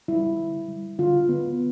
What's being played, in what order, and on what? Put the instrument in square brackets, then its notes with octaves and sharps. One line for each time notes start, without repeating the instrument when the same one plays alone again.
[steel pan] G3 E4
D3
G3
D3 F4
B3